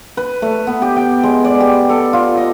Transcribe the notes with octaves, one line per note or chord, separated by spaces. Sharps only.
B4
A3
B3
G4
G5
G#3
D5
G4
A4
F4
D#5